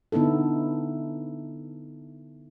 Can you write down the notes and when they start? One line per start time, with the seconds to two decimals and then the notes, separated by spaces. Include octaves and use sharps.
0.12 D3 B3 D#4 E4 A4